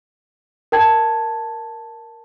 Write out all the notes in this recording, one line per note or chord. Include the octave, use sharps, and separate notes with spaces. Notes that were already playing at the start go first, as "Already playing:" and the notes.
A#4 G5 A5 G#6